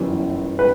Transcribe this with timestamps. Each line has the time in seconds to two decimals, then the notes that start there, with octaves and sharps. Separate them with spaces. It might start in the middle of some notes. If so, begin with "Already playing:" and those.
Already playing: G1 F#2 E3 G3
0.59 B4